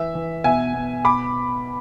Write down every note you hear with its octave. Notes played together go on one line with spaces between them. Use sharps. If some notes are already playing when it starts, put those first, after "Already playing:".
Already playing: E3 E5
E3
B2 E5 G#5
B2
B2 B5 D6